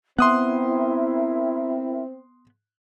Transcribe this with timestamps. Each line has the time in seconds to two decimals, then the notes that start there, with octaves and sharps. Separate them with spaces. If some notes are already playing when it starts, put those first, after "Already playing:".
0.18 B3 C4 E4 A#4 E5 C6 D#6 F#6